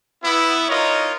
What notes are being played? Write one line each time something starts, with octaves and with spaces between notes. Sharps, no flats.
B3 E4
D#4 F4 A#4 C#5 D#5